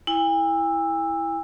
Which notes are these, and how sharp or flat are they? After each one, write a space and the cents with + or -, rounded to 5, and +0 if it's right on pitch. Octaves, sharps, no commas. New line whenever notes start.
E4 +0 G#5 -45 E6 +0